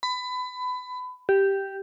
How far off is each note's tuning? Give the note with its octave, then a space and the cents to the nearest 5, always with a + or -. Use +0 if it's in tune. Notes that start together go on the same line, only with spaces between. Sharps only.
B5 +25
G4 -5